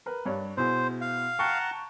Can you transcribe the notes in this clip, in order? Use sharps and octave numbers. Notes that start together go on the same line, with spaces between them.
A#4 B4
G2 C#5 D5
B2 E4 G#4 C5
F5
F#5 G5 A5 A#5 C#6